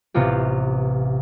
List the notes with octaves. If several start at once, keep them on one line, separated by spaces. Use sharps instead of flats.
A1 C3 B3 F4 G4